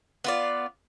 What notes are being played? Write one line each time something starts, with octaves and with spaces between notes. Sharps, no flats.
B3 F4 D5